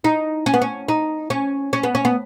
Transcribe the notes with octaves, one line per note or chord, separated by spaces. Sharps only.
D#4
C#4
B3
C#4
D#4
C#4
C#4
B3
C#4
B3